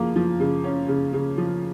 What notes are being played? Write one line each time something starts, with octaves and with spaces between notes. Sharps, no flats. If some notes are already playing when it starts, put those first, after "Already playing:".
Already playing: C#3 F3 A#3
F3
C#3
C#4
C#3
C#3
F3